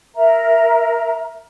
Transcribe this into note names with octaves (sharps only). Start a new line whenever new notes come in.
A#4 E5 A#5